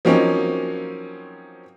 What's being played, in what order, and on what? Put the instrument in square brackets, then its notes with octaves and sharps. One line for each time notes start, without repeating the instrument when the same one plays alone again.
[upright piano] F3 F#3 A#3 C4 C#4 D#4